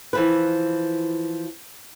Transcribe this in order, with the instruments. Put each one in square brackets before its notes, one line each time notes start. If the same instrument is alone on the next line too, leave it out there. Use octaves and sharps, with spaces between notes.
[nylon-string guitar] E3 F3 B4